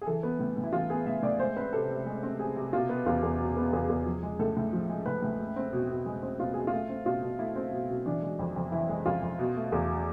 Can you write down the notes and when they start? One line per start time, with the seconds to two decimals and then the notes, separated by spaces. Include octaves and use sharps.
0.01 G#4
0.06 E3 A4
0.23 B3
0.39 A2
0.57 A2
0.64 E4
0.73 E3 F4
0.90 B3 G#4
1.06 A2 E5
1.23 A2 D5
1.39 G#3 C5
1.56 C4 B4
1.73 C3 A4
1.89 C3
2.06 G#3
2.23 C4
2.39 C3 G#4
2.56 C3
2.73 B2 F4
2.89 B3
3.06 E2 F4
3.23 E2
3.40 B2
3.57 B3
3.73 E2 G#4
3.89 E2
4.06 F3
4.23 G#3
4.39 A2 A4
4.57 A2
4.73 F3
4.89 G#3
5.06 A2 B4
5.22 A2
5.39 G#3
5.56 C4
5.73 B2
5.89 B2
6.06 G#3
6.22 C4
6.39 B2 F4
6.54 B2 G#4
6.67 F4
6.73 A3
6.89 C4
7.06 B2 F4
7.22 B2
7.39 A3 E4
7.56 C4
7.72 B2
7.89 B2
8.06 E3 D4
8.22 G#3
8.39 F2
8.56 F2
8.72 E3 E4
8.89 G#3
9.06 F2 F4
9.22 F2
9.39 B2
9.56 A3
9.72 E2